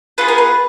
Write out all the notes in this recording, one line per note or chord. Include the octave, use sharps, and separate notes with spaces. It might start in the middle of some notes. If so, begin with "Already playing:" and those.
B3 F4 G#4 B4
A#4
B4